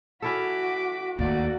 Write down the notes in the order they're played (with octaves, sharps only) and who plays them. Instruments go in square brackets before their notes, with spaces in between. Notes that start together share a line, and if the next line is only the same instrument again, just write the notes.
[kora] C#4 E4 A4 [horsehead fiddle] F#4 [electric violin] D6 B6
[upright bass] D#2 [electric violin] A3 D5 [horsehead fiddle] A#3 F#4